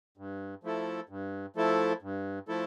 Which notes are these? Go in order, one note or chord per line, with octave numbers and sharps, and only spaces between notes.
G2
F3 A3 E4 A4
G2
F3 A3 E4 A4
G2
F3 A3 E4 A4